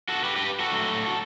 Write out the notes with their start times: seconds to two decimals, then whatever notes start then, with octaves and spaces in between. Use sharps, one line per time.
0.08 F#4 A4
0.24 G4 B4
0.36 G4 B4
0.59 F#4 A4
0.71 A2 F#3 A3